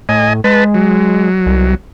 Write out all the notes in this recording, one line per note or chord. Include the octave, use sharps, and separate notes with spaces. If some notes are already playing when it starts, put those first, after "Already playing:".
A2 D#5 G#5
G#3 B4 A5
F#3
C2